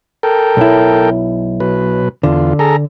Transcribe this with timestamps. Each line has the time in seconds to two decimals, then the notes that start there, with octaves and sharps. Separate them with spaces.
0.23 A4 A#4 G5
0.57 B1 E4
1.60 B2 F#3 B4
2.23 E2 D3 F4
2.59 G#4 A4 A#5